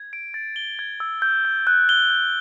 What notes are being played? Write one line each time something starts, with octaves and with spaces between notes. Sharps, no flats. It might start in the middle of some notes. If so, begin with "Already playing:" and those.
Already playing: G#6
D7
A6
G7
G#6
E6
G6
G6
F#6
G7
G6